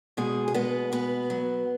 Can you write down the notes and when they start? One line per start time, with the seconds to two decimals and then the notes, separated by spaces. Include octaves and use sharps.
0.17 B2 G#3 G#4
0.48 G#4
0.54 G#3 B3 B4
0.92 B2 B3 B4
1.30 F#3